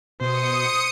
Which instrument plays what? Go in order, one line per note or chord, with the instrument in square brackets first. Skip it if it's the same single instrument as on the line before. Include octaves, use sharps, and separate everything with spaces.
[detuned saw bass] B2 [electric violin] C5 [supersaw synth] D#6 C#7